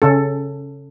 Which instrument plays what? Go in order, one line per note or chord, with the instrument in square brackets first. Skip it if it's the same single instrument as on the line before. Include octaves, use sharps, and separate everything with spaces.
[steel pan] C#3 C#4 A4